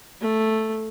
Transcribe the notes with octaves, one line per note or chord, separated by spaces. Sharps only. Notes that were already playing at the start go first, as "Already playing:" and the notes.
A3